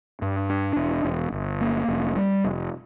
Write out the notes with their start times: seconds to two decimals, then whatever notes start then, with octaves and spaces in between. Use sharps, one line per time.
0.22 G2
0.50 D4
0.76 E1
1.05 E1
1.32 G1
1.61 A#3
1.88 F1
2.16 G3
2.44 F1